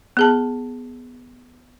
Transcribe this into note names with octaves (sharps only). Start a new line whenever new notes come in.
B3 G#4 A5